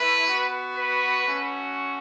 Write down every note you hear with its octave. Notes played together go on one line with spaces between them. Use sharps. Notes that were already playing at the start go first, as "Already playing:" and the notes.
Already playing: A3 E4 B4
B3 F#4
B4
A3 C#4 F#4